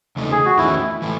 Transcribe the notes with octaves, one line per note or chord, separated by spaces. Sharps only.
E2 C#3 A3 D#4
G#4
F#4
E2 D#3 A3 C#4 E4
E3 A3